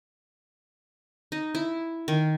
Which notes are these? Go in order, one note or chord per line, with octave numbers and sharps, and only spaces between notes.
D#4
E4
D#3